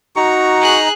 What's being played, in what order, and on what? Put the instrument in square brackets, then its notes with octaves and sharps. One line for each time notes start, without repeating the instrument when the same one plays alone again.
[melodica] D#4 A#5 [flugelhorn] F#4 [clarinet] C#6
[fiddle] G#4 F#6